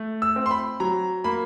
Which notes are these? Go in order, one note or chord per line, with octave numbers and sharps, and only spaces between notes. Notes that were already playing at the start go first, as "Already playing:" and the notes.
Already playing: A3
E6
C4
C6
B5
F#3 A#5
A#3 B5